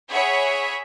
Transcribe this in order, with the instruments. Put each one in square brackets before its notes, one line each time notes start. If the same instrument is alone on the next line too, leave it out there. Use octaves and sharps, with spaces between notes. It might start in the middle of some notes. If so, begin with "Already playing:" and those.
[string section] G#4 C#5 E5 F#5 B5